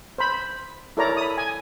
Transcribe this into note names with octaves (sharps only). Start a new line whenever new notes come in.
C5 B5
E4 A4 A#4 C#5 D5 A#5
B5 D#6
G#5